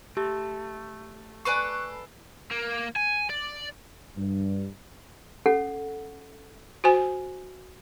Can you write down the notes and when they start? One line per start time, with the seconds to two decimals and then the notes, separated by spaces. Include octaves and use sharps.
0.17 A3 G4
1.45 A4 B4 D5 G#5 B5 C#6 F#6 C7
2.51 A#3
2.96 G#5
3.30 D5
4.16 G2
5.46 C#4 A4 F#5
6.84 F#4 C5 G#5